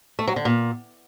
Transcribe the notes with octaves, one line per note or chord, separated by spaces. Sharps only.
A3
F#3
D3
A#2